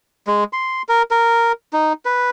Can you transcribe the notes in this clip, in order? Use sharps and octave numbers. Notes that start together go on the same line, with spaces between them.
G#3
C6
A#4
A#4
D#4
B4